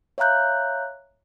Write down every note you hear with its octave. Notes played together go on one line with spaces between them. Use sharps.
C#5 E5 F5 A#5 F#6 G6